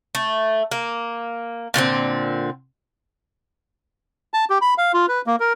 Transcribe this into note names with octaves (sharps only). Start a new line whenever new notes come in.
A3
A#3
A#2 D3 A3 C4
A5
G4
B5
F5
F4
B4
A#3
A#4